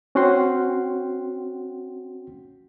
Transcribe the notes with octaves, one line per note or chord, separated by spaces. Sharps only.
C4 C#4 F#4 F#5 G5 C6